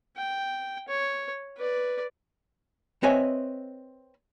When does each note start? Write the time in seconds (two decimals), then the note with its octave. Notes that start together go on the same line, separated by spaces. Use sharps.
0.17 G5
0.88 C#5
1.57 B4 D5
3.03 C4 B4 C#5 D#5 E5 G#5